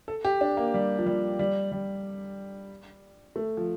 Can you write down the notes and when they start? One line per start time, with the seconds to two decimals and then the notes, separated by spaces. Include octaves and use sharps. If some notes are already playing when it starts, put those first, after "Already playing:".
0.08 A4
0.25 G4
0.41 D4
0.57 A#3
0.74 G3
0.98 F3
1.06 G3
1.39 G3
1.72 G3
3.36 A3
3.57 F3